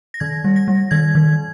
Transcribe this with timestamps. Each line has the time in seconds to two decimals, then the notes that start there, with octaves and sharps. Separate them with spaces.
0.14 A#6
0.20 D#3 G#6
0.44 G3
0.56 A#6
0.68 G3
0.91 D#3 G#6
1.15 D#3